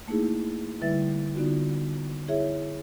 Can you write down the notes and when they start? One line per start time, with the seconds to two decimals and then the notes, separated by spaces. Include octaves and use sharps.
0.08 A3 A#3 D#4 E4 G#4
0.81 D3 G3 E4 B4 E5 A6
1.35 D3 B3 D#4 F4 F#4
2.28 E4 G#4 C#5 E5